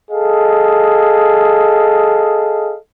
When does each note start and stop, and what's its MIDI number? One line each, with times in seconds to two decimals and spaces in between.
0.11 2.77 68
0.11 2.77 69
0.11 2.77 75
0.11 2.77 77